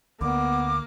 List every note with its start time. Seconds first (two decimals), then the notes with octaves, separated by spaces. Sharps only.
0.21 D2 A#3 B3 D6